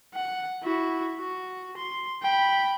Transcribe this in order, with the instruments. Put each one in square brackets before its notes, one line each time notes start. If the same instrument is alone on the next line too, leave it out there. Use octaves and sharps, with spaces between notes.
[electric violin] F#5
E4 F#4
F#4
C6
G5 B5